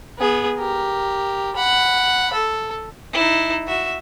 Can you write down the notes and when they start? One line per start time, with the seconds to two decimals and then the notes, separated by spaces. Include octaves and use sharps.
0.19 B3 G#4
0.58 G4 A#4
1.56 F#5 B5
2.33 A4
3.13 D#4 E4
3.67 F#4 E5